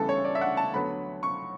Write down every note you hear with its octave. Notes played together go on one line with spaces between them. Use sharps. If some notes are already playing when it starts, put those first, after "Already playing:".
Already playing: D2 C#3 E3 G3 B3 A4
C#5
D5
E5
F#5
A5
D2 D3 F#3 B3 B5
C#6